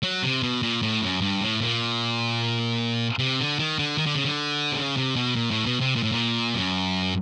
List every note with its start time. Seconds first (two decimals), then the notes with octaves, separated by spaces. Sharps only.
0.03 F#3
0.23 C3
0.43 B2
0.63 A#2
0.82 A2
1.02 F#2
1.22 G2
1.41 A2
1.61 A#2
3.19 C3
3.39 D3
3.59 D#3
3.79 D3
3.98 D#3
4.06 D3
4.15 C#3
4.25 D3
4.72 C3
4.77 C#3
4.97 C3
5.16 B2
5.36 A#2
5.51 A2
5.66 B2
5.80 C3
5.96 A#2
6.03 A2
6.12 A#2
6.55 F#2